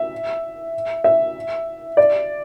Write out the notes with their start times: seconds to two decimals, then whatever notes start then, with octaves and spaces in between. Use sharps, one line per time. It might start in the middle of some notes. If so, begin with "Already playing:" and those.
Already playing: E5
1.04 E5
1.97 D5